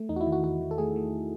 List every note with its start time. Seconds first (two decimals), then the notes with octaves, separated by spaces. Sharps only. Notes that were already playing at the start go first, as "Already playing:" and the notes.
Already playing: A3
0.09 E2 D#4
0.16 F#4
0.21 E4
0.27 D#3
0.32 F#4
0.44 E2 F#4
0.61 D#3
0.71 A4
0.78 A3 G#4
0.96 A3